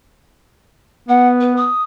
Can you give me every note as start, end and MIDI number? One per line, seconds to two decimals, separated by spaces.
1.09 1.68 59
1.09 1.28 78
1.41 1.55 71
1.57 1.83 87